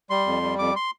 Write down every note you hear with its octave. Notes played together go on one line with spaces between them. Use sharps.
G3 C6
F2
G3
F2 D6
C6